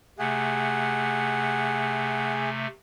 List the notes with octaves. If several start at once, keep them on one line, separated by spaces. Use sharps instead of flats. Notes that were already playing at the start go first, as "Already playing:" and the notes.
C3 A3 G#4 F#5